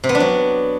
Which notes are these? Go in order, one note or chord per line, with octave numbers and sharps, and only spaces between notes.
C3
B3
D4
F#3